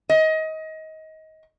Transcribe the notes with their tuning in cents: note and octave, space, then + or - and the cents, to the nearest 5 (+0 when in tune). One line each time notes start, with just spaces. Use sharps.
D#5 +25